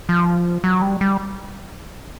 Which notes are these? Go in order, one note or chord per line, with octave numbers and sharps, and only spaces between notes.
F3
F#3
G3
G3